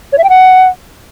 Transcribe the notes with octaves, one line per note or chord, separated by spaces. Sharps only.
C#5
E5
G5
F#5